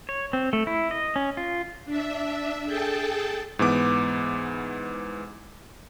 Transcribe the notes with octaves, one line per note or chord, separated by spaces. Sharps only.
C#5
C4
A3
E4
D#5
C#4
F4
D4 E5
G#4 A4 G5 A5
G#2 E3 B3 D6